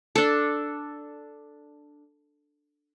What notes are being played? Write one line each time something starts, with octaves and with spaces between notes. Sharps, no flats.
D4 A4